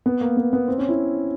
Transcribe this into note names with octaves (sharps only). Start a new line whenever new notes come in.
B3
A#3
B3
B3
C4
C#4
E4